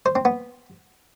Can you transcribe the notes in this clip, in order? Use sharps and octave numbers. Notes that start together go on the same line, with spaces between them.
C5
C4
B3